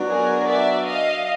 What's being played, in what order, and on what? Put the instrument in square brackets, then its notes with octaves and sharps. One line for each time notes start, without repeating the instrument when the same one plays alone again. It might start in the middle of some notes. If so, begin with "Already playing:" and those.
Already playing: [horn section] F#3 B3 D4
[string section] G#4 A#4
D5 E5
D#5 F5